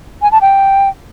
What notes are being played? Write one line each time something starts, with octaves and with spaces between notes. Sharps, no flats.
G#5
A5
G5